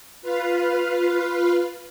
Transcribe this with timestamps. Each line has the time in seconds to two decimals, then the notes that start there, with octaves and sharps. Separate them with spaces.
0.22 F4 B4 F5